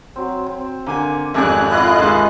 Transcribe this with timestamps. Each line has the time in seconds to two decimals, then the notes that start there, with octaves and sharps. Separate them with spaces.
0.16 F#3 C4
0.46 C4
0.87 D3 A#3 G#5
1.34 G#1 F2 G4 A4 G#5 F#6
1.70 A3 B3 E4 F4 D#5 F#6
1.98 D#2 G#2 G#3